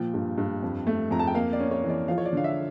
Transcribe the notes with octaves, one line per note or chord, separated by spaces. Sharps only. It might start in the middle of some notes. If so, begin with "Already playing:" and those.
Already playing: A#2 F3 G5
G2
G2
F2
A3
F2 A#5
A5
G5
A#3 F5
D5
C#4
C#5
E3
D5
F3 F5
C#5
D5
D3 F5
E5